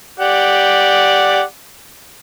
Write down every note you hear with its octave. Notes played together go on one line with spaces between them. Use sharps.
G4 D5 F#5